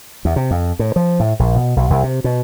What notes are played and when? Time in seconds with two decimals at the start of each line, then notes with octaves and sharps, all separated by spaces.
0.25 E2
0.36 C3
0.51 F2
0.79 A2
0.96 F3
1.20 A2
1.39 A#1
1.56 B2
1.76 B1
1.90 C2
2.03 C3
2.24 B2